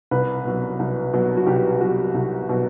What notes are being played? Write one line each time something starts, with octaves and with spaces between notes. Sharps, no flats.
C2 B4
B2 F#3
C2
B2 F#3
F#4
C2 G4
B2 F#3 F#4
C2
B2 F#3